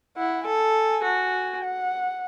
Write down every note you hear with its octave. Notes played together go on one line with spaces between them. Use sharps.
E4 F#5
A4 G#5
F#4
F#5